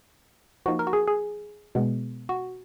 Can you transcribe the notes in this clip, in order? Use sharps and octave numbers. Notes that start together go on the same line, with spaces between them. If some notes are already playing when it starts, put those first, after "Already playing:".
F3 A#3 D#4 F#4
A#4
F#4
G#4
G#4
B2 G#3 B3
F#4